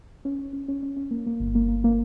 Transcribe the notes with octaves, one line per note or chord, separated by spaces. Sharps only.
C#4
C#4
C#4
C#4
C#4
C#4
A#3
A#3
G1
A#3
A#3
A#3